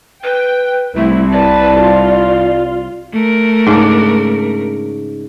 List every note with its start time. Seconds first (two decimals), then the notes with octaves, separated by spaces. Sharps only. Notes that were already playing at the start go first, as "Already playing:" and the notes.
0.24 B4 G5
0.96 C2 A3 E4
1.32 B4 D5 A5
1.80 F4
3.12 A3 A#4
3.67 G#2 C#3 D4